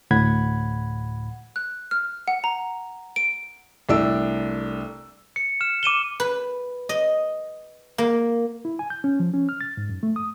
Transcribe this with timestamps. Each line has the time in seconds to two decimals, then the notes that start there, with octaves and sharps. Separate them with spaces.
0.11 D2 A2 F#5 B5 G#6
1.56 F#6
1.91 F6
2.28 F#5
2.44 A#5
3.16 D7
3.89 C2 A3 D4 A4 E6 D7
5.36 C#7
5.61 F6 E7
5.83 D6 D#7 E7 G7
6.20 B4
6.89 D#5
7.98 A#3
8.65 E4
8.79 G#5
8.90 G6
9.04 C#4
9.20 F3
9.34 C#4
9.49 F6
9.61 A6
9.77 G#2
9.89 F#2
10.03 A3
10.16 D#6